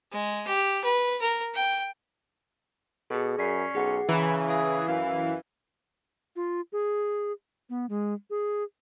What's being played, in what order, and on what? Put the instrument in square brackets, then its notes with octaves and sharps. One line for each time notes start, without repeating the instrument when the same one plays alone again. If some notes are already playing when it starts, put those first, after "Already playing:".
[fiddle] G#3
G4
B4
A#4
G5
[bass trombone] B2 [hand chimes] G#4 A4
[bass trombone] F#2 [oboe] C#4 [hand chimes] D5 B6 C7
[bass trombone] B1 [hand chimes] G#4 F#5
[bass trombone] C#3 [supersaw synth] E3 [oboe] E4 [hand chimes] A#5
[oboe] G#4 [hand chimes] E5 F5 G#5
[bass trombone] F#2 [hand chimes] C#4 [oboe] F5
[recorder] F4
G#4
B3
G#3
G#4